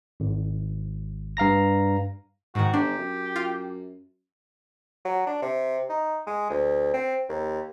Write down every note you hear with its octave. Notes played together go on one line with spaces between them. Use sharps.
G#1
G2 F5 A#5 A#6
G#2 D#3 F#4
G1 D4 G4
F#2
F4
F#3
D4
C3
D#4
G#3
D2
C4
D#2